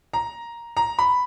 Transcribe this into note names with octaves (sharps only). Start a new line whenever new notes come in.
A#5
A#5
B5